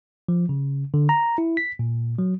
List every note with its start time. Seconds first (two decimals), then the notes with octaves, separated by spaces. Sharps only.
0.29 F3
0.49 C#3
0.94 D3
1.09 A#5
1.38 E4
1.57 B6
1.79 A#2
2.19 F#3